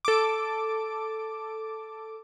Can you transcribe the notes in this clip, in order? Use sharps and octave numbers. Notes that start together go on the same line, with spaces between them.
A4 D6